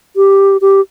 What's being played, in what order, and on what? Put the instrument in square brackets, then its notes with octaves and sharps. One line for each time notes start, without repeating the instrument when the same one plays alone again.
[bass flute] G4
G4